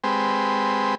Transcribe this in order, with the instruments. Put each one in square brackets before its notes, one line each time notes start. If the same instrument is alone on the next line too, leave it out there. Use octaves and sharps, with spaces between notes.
[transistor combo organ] G#3 C4 G4 B4